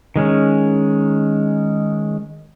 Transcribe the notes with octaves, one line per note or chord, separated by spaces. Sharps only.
D#3 G#3 C#4